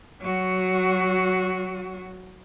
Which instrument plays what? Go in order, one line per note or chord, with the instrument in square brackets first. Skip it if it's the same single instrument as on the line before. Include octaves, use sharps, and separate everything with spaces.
[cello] F#3 F#4